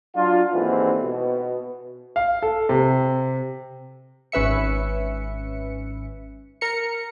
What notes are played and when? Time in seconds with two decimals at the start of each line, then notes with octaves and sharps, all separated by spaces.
0.16 F#3 D4 F4
0.54 D#2 G#2 D3 E3 C4
1.01 B2
2.16 F5
2.42 A4
2.69 C3
4.32 G#1 C#4 B4 E5 C#7
6.61 A#4 C#7